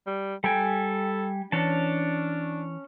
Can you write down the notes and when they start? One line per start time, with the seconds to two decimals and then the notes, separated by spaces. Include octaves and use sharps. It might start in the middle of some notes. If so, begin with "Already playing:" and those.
0.07 G3
0.44 G3 A4 G5 G#5
1.52 E3 C#4 D4 A5